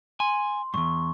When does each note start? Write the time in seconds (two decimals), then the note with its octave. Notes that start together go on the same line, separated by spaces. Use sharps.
0.20 G#5 C6
0.74 E2 G2 C#6